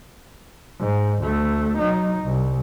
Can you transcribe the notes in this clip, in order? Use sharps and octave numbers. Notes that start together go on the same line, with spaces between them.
G#2
D2 A3
F#3 D#4
C2